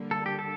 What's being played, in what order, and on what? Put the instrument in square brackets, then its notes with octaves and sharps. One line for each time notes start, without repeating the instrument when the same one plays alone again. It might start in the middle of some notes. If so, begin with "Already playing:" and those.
Already playing: [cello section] D3 G3 A#3
[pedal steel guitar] A4
G4
A4